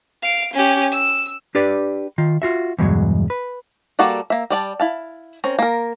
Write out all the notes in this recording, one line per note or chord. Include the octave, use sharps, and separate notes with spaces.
F5 D7
C#4 G4
E6
D4 G4 B4 D5
D#3 F4
F4 F#4 E5
E2 G2 B2 F3 F#3 G#3
B4
G3 A#3 F#4 A4 D5
A#3 E5
G3 D5 A5
E4 F5 A5
C4 C#4 A#4
A#3 A#4